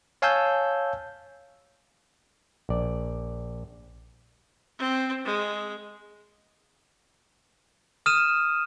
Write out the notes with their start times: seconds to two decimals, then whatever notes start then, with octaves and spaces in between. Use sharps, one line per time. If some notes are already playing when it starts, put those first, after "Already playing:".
0.22 C#5 F5 G#5 A5 E6 G6
2.69 A#1 D5
4.79 C4
5.25 G#3
8.06 D#6 F6 D#7 E7